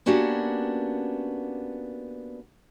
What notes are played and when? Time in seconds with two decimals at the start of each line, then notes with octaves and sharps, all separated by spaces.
0.06 A#3 B3 C#4 D4 F#4 G4